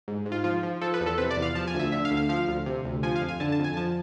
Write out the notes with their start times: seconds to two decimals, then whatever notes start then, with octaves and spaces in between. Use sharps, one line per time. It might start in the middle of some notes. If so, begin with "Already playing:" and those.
0.08 G#2
0.26 G#2
0.32 F4
0.44 F3 F4
0.63 F3
0.81 F3 A4
0.94 B4
1.00 E2
1.06 A4
1.18 C3 B4
1.31 D5
1.37 E2
1.42 F5
1.55 F3 A5
1.67 G#5
1.74 D2
1.79 E5
1.92 D3 E5
2.05 F5
2.11 D2
2.17 F5
2.29 F3 F5
2.48 D2
2.66 C3
2.85 D2
3.03 F3 G#5
3.16 F5
3.21 F2
3.28 G#5
3.40 D3 A5
3.52 A5
3.59 F2
3.64 G#5
3.77 F3 A5